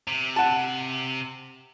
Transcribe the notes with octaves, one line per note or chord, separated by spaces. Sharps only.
C3
F#5 A5